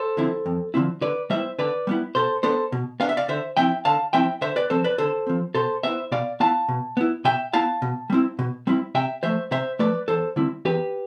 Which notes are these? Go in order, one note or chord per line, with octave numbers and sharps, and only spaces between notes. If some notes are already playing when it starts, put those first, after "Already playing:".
Already playing: A4 C5
D3 F3 C4 E4
F2
D3 F3 C4 E4
D3 B4 D5
G3 B3 E4 C5 E5
D3 B4 D5
G3 B3 E4
B2 A4 C5
B3 D4 A4 C5
B2
B3 D4 F5
E5
D5 F5
D3 C5 E5
F3 C4 E4 E5 G5
D3 F5 A5
F3 C4 E4 E5 G5
D3 C5 E5
B4 D5
F3 C4 A4 C5
B4 D5
D3 A4 C5
F3 C4
B2 A4 C5
B3 E4 C5 E5
B2 D5 F5
B3 E4 F5 A5
B2
B3 E4
B2 E5 G5
B3 E4 F5 A5
B2
G3 C4 E4
B2
G3 C4 E4
C3 E5 G5
F3 A3 C5 E5
C3 C5 E5
F3 A3 B4 D5
E2 A4 C5
D3 G3 C4 E4
E2 G4 B4